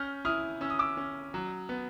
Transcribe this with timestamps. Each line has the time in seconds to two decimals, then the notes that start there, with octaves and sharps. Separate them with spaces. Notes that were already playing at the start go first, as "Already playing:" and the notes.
Already playing: C#4 F6 G6
0.25 E4 D#6 F6
0.61 C#4 E6
0.70 D#6
0.79 D6 E6
0.97 C#4
1.34 F#3
1.69 B3